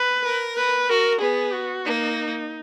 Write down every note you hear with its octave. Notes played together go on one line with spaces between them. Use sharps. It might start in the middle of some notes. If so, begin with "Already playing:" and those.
Already playing: B4
A#4
B4
F#4 A#4
B3 G#4
F#4
A#3 D#4